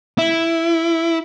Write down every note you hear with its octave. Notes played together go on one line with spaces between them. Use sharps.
E4